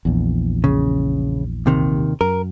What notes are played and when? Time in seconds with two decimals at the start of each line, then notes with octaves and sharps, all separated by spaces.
0.05 A#1 E2
0.64 C#3
1.66 D#2 C3 D#3
2.21 F#2 A#4